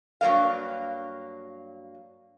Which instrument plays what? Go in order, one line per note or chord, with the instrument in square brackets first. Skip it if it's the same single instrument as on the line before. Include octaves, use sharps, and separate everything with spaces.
[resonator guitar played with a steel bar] G2 F#3 G3 A#3 F5